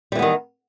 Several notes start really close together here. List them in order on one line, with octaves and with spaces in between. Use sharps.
G3 E3 B3 D#3